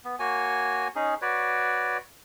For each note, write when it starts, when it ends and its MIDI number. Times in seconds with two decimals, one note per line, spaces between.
0.05 0.16 59
0.19 0.88 58
0.19 0.88 66
0.19 0.88 73
0.19 0.88 80
0.95 1.15 61
0.95 1.15 63
0.95 1.15 68
1.22 1.98 66
1.22 1.98 71
1.22 1.98 73
1.22 1.98 74